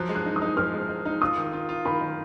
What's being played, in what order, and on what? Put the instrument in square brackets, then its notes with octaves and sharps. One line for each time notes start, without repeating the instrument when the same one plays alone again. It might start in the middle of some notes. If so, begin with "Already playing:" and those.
Already playing: [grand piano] F3 F#3 [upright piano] F#6
[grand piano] G#3
[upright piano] F#6
[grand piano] D#4
[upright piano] D#6
[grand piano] D#4
[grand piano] F3 [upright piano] F6
[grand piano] G#3
G#3
D#4
[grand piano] F4 [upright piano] D#6
[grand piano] D#3
F4
F4
[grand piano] D#3 [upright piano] B5
[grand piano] D#3